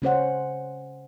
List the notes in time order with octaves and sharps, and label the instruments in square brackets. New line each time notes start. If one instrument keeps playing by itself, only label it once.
[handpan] C#3 C#4 C5 F#5